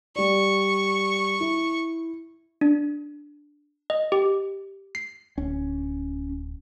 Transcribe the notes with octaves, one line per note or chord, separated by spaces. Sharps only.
G3 D5 C#6
E4
D4
D#5
G4
C7
D1 C#4